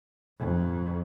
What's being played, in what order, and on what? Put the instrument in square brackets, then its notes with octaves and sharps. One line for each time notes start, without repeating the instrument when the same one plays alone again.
[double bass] F2